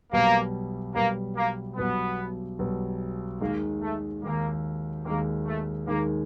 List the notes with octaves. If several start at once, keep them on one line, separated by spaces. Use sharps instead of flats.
B1 B2 G3 A#3
B1 B2 G3 A#3
A#3
B1 B2 G3 B3
B1 B2 G3
D#2 D#3 G#3 A#3
A3
D#2 D#3 G#3 A#3
D#2 D#3 G#3 A#3
A3
D#2 D#3 G#3 A#3